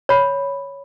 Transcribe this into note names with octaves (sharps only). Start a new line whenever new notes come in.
C#5 B5